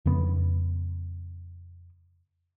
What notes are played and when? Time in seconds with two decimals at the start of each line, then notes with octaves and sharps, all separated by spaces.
0.06 F2 C#3 B3